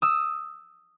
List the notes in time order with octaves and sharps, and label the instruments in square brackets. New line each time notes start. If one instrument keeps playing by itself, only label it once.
[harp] D#6 E6